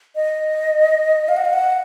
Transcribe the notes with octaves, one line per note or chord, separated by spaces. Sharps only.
D#5
F5
F#5
F5
F#5